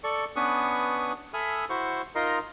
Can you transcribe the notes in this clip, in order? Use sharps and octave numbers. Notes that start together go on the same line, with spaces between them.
A4 D5 C#6
B3 C#4 D4 B4 C#6 D#6
A4 E5 G#5 B5 D#6 F6
E4 F#4 C5 C#6
D#4 F4 A#4 D#5 A#5 C6